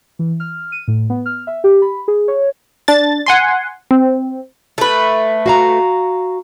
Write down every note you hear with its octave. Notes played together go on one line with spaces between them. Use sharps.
E3
F6
D#7
A2
B3
F6
E5
G4
B5
G#4
C#5
D4 A6
F#5 G#5 C6
C4
A3 B4
F#4 F5 A#5